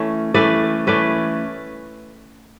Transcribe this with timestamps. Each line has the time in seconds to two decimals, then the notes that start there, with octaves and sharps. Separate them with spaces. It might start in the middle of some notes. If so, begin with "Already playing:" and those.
Already playing: E3 A3 C#4
0.34 E3 A3 C#4 B4 D5
0.87 E3 A3 C#4 B4 D5